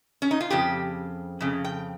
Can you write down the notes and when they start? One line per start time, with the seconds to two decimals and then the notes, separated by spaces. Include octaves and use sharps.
0.22 C#4
0.31 D#4
0.41 F4
0.50 F2 C#3 G4
1.41 F2 C#3
1.64 G5